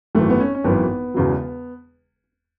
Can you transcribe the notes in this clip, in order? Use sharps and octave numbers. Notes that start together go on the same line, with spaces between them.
G#1 F#2 E3 A3
B3
C#4
C#4
G#1 F#2 E3 B3
E1 E2 C#3 F#3